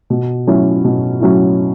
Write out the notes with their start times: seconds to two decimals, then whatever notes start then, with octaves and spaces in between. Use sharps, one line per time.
0.10 B2
0.47 F#3 C#4 E4
0.85 B2
1.21 F#3 C#4 E4